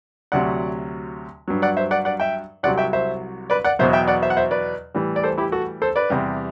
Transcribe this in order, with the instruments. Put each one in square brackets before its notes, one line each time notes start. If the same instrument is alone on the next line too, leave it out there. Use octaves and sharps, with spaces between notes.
[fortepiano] D2 C3 F#3 D5 F#5
G2 F#3
D5 F#5
C5 E5
D5 F#5
D5 F#5
E5 G5
C2 C3 F#3 D5 F#5
E5 G5
C5 E5
B4 D5
D5 F#5
E2 B2 F#3 C5 E5
E5 G5
D5 F#5
C5 E5
F#5
C5 E5
B4 D5
A2 E3 G3
D5
A4 C5
E4 G4
F#4 A4
A4 C5
B4 D5
E2 C3 G3